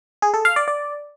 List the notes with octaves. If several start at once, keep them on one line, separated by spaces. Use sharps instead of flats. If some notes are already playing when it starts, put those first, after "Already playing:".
G#4
A4
F5
D5
D5